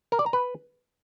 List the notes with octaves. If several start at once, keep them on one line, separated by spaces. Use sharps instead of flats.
A#4
D5
A#5
B4